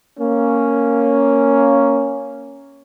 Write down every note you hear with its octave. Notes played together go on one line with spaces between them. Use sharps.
A#3 C#4